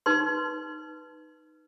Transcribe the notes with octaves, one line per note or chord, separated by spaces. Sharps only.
D#4 B4 C6